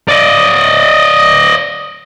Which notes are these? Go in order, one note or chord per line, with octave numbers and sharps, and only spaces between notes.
D5 D#5